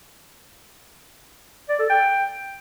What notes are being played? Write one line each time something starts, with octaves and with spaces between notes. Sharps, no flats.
D5
A4
G5